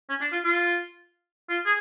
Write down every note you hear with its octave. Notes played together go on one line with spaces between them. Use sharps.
C#4
D4
F4
F4
F4
G#4